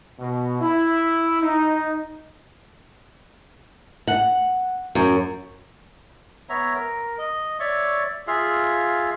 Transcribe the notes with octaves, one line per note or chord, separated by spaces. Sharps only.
B2
E4
D#4
F#5
F#2
B3 C#5 E5 A#5
A#4
D#5
C#5 D5 E5 C#6
F4 G#4 E5 F5